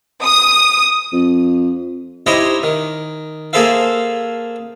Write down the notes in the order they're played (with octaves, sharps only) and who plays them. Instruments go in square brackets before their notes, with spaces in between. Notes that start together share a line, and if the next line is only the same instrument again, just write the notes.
[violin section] D#6
[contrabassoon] F2
[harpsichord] D#4 E4 G4 C5 C#5 D#5
D#3
A#3 G#4 A4 C5 E5 F5